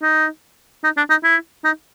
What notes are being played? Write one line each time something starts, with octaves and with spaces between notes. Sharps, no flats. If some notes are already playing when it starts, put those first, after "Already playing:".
D#4
D#4
D4
D#4
E4
D#4